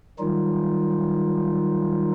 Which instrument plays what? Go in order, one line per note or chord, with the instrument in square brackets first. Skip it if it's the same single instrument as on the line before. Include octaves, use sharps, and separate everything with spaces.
[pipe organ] D#3 F#3 G3 D#4 F4